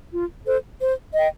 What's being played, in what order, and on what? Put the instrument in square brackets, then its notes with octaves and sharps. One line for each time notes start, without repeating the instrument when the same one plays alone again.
[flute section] F4
A4 C5
C5
D#5 G5